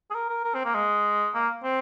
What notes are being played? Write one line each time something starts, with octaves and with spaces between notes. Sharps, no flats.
G#4
A#4
A#4
A#4
C4
A#3
G#3
A#3
C4